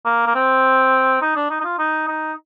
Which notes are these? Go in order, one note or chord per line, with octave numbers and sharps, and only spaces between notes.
A#3
A#3
C4
D#4
D4
D#4
D#4
F4
D#4
D#4